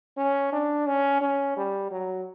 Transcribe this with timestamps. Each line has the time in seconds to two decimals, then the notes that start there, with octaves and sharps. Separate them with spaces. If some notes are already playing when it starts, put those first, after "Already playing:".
0.17 C#4
0.52 D4
0.87 C#4
1.21 C#4
1.57 G3
1.91 F#3